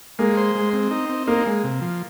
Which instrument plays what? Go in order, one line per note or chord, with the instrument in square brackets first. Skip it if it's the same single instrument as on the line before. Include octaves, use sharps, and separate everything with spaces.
[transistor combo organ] G#3 [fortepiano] A#3
[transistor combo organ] C5
G#3
C4
D#4
C4
[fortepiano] A#3 [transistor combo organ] D#4
[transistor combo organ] G#3
C3
F3